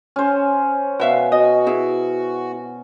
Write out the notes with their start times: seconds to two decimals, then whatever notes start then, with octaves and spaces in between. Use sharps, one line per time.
0.16 C#4 C5
1.00 B2 F#4 E5 F5
1.32 F#4 D#5
1.67 E4 G#4